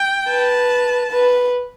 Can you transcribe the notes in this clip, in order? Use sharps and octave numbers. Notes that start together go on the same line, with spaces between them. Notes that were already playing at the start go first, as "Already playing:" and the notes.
Already playing: G5
B4 A5
B4